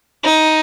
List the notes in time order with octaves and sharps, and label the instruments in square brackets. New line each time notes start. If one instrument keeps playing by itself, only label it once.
[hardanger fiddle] D#4